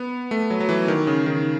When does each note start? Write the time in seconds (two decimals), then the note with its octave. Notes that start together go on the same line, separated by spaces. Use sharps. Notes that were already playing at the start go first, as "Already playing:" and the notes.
Already playing: B3
0.31 A3
0.50 F#3
0.60 F#3
0.69 E3
0.88 D#3
1.07 C#3
1.26 D#3